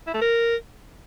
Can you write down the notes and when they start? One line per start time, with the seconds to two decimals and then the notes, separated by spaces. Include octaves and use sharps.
0.07 E4
0.14 A3
0.21 A#4